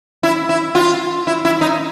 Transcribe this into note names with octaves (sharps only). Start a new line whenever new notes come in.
E4
E4
F4
E4
E4
D#4